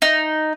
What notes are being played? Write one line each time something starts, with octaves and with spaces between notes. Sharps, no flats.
D#4